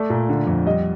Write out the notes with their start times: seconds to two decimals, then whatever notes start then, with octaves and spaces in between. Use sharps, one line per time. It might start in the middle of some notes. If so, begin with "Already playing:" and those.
Already playing: A3 D5
0.10 A#2
0.29 D3
0.47 F2
0.66 G3 D#5